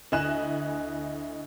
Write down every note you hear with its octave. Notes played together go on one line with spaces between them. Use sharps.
D2 E4 D#5 G#5 F#6 E7